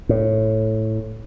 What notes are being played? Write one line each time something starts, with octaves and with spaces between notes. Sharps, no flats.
A2